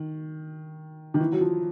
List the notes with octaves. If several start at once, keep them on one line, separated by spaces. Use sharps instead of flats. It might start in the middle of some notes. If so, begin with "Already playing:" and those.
Already playing: D#3
D#3
E3
F#3
F3